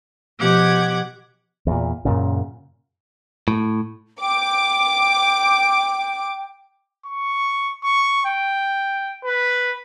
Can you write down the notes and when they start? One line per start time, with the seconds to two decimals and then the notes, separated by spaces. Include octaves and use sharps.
0.38 B2 F3 G4 F#5 D6 G#6
1.67 E2 A#2
2.05 F#2 A#2 C#3
3.48 A2
4.21 G5 D6
7.06 C#6
7.84 C#6
8.25 G5
9.25 B4